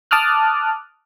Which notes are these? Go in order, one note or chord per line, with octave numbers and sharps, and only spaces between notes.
A5 D6 D#6 F6 F#6